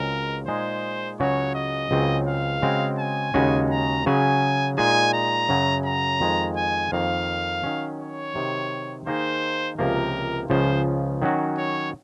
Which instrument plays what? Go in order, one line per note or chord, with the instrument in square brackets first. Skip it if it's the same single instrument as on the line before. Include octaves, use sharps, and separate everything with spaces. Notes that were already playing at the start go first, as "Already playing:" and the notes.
Already playing: [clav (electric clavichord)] C#2 C#3 G#3 C4 F#4 [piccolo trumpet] A#4
[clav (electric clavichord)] A#2 G#3 D#4 G#4 [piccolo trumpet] C5
[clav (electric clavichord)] C#2 C#3 F#3 C#4 F#4 [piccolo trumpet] C#5
[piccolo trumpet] D#5
[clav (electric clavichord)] C#2 C#3 F#3 C4
[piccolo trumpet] F5
[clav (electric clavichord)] C#3 G#3 C4 F#4
[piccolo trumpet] G#5
[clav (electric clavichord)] D#2 C#3 G#3 C#4 F#4
[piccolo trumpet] A#5
[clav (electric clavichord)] C#3 F#3 C#4 G#4 [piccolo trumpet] G#5
[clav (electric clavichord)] A#2 G#3 D#4 G#4 [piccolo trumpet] G#5
[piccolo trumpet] A#5
[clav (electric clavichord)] F#2 C#3 F#3 C#4
[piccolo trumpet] A#5
[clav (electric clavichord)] F2 D#3 G#3
[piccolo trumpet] G#5
[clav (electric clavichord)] F2 D#3 A#3 [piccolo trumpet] F5
[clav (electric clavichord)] D#3 F#3 C#4
[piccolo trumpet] C#5
[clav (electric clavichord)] C3 D#3 F#3
[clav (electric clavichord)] D#3 A#3 D#4 G#4 [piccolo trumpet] C5
[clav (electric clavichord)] C#2 C3 F3 A#3 [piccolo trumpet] A#4
[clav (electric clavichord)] C#2 C#3 F3 [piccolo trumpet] C5
[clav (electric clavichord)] D#3 F#3 C#4 F#4
[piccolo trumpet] C#5